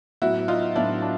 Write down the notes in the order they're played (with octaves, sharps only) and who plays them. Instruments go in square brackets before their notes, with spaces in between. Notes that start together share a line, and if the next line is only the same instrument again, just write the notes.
[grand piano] A2 F#3 B3 [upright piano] E4 F#4
[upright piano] D#4 F4
[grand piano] A2 F#3 B3 [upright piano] D4 E4
[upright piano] D4